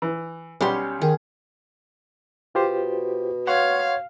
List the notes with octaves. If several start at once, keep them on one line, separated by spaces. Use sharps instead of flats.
E3
B1 G3 C#4 G4 C6
D#3 G#4
B2 F4 G4 C5
C#5 F5 F#5 C6 C#6